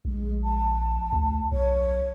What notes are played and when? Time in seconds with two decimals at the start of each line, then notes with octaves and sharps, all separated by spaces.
0.05 A#1 G#3
0.44 A5
1.12 D2
1.52 B1 C#5